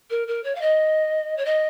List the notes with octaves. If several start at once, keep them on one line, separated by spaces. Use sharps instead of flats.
A#4
A#4
C#5
F5
D#5
C#5
D#5